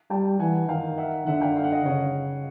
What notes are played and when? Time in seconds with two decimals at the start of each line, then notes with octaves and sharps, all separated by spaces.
0.10 G3 G5 A5
0.39 E3 F#5 G#5
0.69 D#3 F5 G5
0.98 E5 F#5
1.27 D3 E5 F#5
1.41 F5 G5
1.57 F5
1.64 F#5
1.72 D#5 F5
1.85 C#3 C#5 D#5